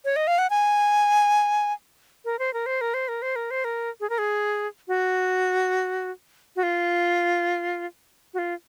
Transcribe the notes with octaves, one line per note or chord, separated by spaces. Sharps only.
C#5
D#5
F5
F#5
G#5
A#4
C5
A#4
C5
A#4
C5
A#4
C5
A#4
C5
A#4
G#4
A#4
G#4
F#4
F#4
F4
F#4
F4